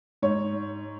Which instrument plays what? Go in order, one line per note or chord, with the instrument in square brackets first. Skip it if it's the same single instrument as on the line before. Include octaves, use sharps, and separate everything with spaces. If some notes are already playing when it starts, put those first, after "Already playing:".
[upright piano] G#2 C#5